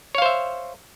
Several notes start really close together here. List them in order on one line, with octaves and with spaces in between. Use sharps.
C#5 F5 C5 E5